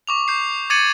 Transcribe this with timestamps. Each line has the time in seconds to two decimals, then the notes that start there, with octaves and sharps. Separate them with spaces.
0.07 C#6 D6 F7
0.28 G6 C7
0.70 D6 G#6 A6 C#7 D#7 F#7